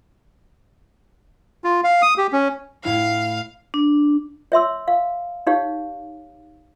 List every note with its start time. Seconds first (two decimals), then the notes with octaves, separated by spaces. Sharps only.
1.64 F4
1.84 F5
2.02 D#6
2.17 G4
2.33 C#4
2.84 A2 E4 F5 F6
3.74 D4
4.52 C#5 E5 C6 E6
4.88 F5
5.47 D#4 G4 C#5 F5